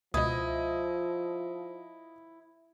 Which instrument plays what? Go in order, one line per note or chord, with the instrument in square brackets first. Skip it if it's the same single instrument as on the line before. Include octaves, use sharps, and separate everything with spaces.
[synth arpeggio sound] C#2 B2 [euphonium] F3 [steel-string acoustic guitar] E4 [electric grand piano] D#5 D#6